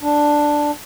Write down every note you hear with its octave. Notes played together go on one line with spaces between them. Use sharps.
D4